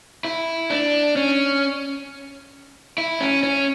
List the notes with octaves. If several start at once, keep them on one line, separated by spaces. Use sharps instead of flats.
E4
D4
C#4
E4
C#4
C#4